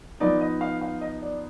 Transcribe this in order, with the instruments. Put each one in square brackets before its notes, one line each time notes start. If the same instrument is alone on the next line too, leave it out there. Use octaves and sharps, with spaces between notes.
[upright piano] F3 B3 D#4 D5
D#5
F5
F5
D#5
D5